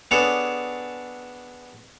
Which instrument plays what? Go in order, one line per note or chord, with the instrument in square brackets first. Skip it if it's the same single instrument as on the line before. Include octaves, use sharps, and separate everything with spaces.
[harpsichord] B3 D4 G#4 A4 C#5